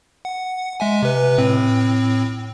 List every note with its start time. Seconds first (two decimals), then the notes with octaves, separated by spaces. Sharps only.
0.25 F#5
0.80 G#3 E5 G#5
1.02 C3 B4
1.38 A2 C4